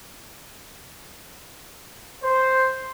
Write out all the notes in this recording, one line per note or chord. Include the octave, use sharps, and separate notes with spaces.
C5